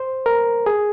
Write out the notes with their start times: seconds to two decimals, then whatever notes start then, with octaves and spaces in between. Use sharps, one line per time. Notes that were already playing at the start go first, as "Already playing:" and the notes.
Already playing: C5
0.26 A#4
0.66 G#4